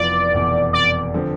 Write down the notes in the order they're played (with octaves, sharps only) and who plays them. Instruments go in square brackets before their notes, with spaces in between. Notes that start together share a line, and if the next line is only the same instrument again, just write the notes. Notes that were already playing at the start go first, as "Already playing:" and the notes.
Already playing: [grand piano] F1 F2 E3 B3 F4 [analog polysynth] D5
[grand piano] F1 E2 B2
[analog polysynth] D5
[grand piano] D3 F3 C4